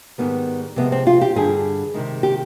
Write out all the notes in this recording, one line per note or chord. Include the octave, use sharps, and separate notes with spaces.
G#2 D#3 G3 B3
C3 F3 G#3 B3
C4
F4
G4
G2 D3 G3 G#4
C3 D#3 G#3
G4